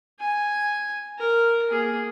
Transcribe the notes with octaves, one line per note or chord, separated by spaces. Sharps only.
G#5
A#4
A#3 G#4